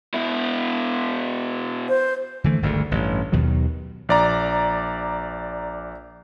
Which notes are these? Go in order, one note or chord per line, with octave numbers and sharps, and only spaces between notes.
B2 E4
C5
D3 E3 A3
G#1 D2 G2 D3
A1 G2
D#2 B2 D#3 F#3
A#1 D5 A#5